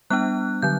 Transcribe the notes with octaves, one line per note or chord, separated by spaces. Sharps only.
G3 B3 D4 F#6
D3 F#3 G6